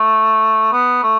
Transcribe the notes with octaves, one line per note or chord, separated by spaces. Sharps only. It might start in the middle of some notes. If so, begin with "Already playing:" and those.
Already playing: A3
B3
A3